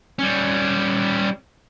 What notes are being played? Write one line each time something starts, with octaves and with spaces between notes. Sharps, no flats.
G3 C#4